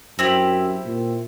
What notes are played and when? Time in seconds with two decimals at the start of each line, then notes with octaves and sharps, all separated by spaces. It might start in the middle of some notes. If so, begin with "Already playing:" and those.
0.19 F#2 C4 E4 G4
0.86 A#2